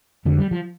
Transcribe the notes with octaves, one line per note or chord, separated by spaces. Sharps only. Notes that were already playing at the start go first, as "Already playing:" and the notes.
F2 D3 A3
G3
F3